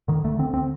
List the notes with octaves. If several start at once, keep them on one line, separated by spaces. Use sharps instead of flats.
D3 D#3
D2 A3
D3 C4
C4